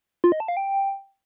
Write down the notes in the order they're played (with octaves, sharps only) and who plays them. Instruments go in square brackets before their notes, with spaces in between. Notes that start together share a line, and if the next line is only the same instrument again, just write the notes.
[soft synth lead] F4
D#5
A5
F5
G5